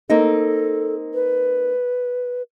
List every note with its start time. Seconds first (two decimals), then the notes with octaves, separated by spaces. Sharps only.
0.10 A#3 C4 D#4 A4
1.14 B4